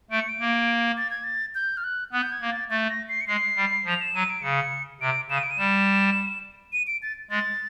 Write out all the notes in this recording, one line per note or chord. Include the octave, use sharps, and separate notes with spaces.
A3 D7
C#7
D7
A#3
A6
G#6
A6
G6
F6
F#6
B3 F#6
G6
G#6
A#3
A6
A3 A6
A#6
C7
C#7
G#3 C7
G3
F3 F7
E7
F#3 D#7
D7
C#3 C#7
C3 D7
C#3 E7
D#7
D7
D#7
G3 E7
D#7
D7
A6
G#3 A6